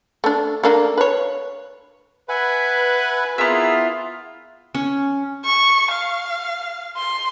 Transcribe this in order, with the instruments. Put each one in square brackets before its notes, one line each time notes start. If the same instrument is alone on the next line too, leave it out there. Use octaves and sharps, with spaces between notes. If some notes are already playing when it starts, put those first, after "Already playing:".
[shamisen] A3 D4
A3 A#3 D4
B4 C#5
[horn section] B4 [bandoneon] E5 F#5 G#5
[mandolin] B3 E4 [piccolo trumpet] F4 [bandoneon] G#4 A#4 E6
[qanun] C#4
[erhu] C#6
F5
C6